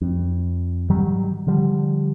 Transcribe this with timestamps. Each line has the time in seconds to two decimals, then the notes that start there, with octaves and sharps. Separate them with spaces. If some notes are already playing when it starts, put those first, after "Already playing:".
0.01 F2
0.89 G#2 D#3 F#3 G3
1.47 D3 F3 G3